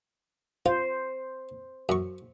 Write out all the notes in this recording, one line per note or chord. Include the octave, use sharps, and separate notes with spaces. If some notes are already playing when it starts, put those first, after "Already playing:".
F4 C5
F#2 C#6